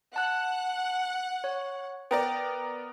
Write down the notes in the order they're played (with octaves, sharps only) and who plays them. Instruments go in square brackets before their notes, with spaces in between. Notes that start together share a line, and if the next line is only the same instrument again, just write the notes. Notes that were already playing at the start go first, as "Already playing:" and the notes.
[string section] F#5 [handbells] A5 F#6
[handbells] C#5
[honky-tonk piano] B3 A#4 D5 [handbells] G5